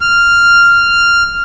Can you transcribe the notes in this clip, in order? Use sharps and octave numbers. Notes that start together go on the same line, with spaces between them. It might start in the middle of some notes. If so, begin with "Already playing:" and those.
F6